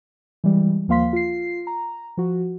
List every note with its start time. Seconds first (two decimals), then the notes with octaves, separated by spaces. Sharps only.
0.44 E3 G3 G#3
0.88 D#2 F3 A#3 F5 C6 B6
1.13 F4 C7
1.67 A#5
2.17 F3 F#4